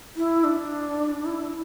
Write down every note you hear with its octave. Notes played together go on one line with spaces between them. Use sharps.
E4
D4
E4